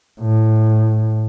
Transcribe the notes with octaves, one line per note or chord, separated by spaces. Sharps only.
A2